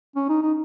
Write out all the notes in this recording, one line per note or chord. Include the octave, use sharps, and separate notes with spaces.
C#4
D#4
D#4